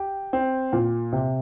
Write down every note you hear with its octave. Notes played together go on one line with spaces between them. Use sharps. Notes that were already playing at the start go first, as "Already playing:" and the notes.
Already playing: G4
C4
A#2
C3